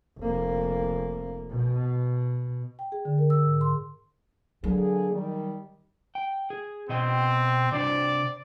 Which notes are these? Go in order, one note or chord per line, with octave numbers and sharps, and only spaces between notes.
F1 A#3
B2
G5
G#4
D3
A#4
E6
G#2
C6
D3 F#3 A#3 G#4
D#3 G3
G5
G#4
B2 C4 D#5 G5
C3 D4 C5 D5